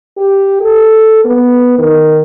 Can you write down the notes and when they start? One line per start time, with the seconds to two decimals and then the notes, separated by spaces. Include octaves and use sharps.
0.17 G4
0.61 A4
1.25 B3
1.79 D#3